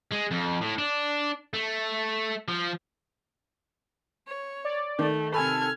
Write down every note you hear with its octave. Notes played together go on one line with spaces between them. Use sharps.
G#3
F2
A2
D4
A3
F3
C#5
D5
D#3 A3
C3 A4 G#5 B5 F6 G#6